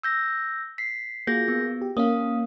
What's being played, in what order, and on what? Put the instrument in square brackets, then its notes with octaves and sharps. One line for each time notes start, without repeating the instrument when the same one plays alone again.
[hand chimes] E6 G6 A#6
B6 C7
[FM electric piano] A#3 F4 F#4 [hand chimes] G#4 G6 A#6
[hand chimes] B3
[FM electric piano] G4
[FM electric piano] A#3 C#4 [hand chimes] F5 D#6